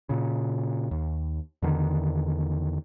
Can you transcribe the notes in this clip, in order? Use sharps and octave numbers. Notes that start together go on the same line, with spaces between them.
A#2 C#3
D#2
E2 D3 D#3